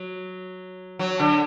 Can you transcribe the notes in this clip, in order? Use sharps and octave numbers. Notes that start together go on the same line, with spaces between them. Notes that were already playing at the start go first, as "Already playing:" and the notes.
Already playing: F#3
F#3
D3